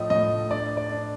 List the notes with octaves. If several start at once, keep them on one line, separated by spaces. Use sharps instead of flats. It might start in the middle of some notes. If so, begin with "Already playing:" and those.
Already playing: A2 F3 A3 D#5
A2 D#5
D4 D5
D5
D4